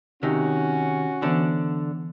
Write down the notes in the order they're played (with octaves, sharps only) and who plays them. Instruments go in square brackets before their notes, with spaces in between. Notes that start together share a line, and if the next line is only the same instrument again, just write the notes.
[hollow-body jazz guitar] C3 D#3 D#4 [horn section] C#4 F#4
[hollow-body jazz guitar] D3 D4 [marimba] E3 B3 C5